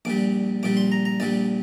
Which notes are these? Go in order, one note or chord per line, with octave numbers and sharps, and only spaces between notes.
A#1 A#2 G3 D6
A#1 A#2 G3 D6
C6
A#5
A#5
A#1 A#2 G3 D5